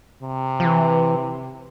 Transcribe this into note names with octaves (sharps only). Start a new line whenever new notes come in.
C3
F3
E3